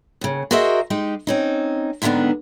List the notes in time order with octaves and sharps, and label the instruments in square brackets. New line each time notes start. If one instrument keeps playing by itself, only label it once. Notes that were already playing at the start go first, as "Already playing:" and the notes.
[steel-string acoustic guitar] D#2 C#3
F#4 G#4 A#4 C5 D#5 E5
G#3 D#4 G4
C4 C#4 D#4
G#2 D3 D#3 A3 B3 D4